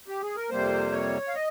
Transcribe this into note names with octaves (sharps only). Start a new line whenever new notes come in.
G4
G#4
A#4
F2 C3 G3 A#3 C5
C#5
F5
D#5